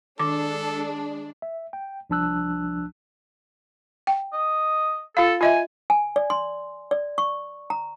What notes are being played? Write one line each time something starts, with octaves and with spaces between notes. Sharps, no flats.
D#3 G#3 D4 A4 D6
E5
G5
C2 F3 D4 A5 E6 F#6
G5
D#5
F4 A4 F5
F4 D#5 E5 G#5
G#5
D5
C6
D5
C#6
A#5